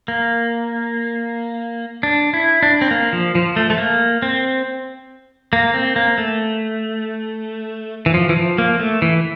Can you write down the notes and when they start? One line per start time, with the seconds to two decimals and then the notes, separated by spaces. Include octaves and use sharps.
0.08 A#3
2.03 D4
2.34 E4
2.63 D4
2.82 C4
2.91 A#3
3.13 F3
3.35 F3
3.56 A3
3.70 A3
3.78 A#3
4.22 C4
5.53 A#3
5.74 C4
5.96 A#3
6.18 A3
8.06 E3
8.14 F3
8.29 E3
8.36 F3
8.58 A#3
8.79 A3
9.02 E3